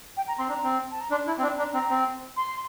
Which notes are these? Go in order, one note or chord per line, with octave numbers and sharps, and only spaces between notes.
G5
A#5
C4 C6
D4 A#5
C4
A5
A#5
D4 C6
E4 A5
C4
D4 C6
D4 A#5
C4 A#5
C4
C6